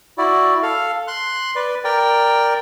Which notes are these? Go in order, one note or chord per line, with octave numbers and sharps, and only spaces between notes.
E4 F#4 D5
A4 F5
C6 F#6
B4 D5
A#4 D5 G5